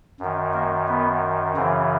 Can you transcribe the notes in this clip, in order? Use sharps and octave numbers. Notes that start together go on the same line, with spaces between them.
F#2 D#3
A#3
B3
F#2 C#3 E3 C4